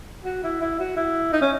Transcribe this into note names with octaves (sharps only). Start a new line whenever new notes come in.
F#4
E4
E4
F#4
E4
D#4
C#4